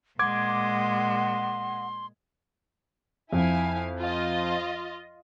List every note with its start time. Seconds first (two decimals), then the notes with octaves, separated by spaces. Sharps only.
0.19 A#2 G#3 F#5 C6 D6 G#6
3.33 F2 E4 F5 G#5
4.00 F4 D#5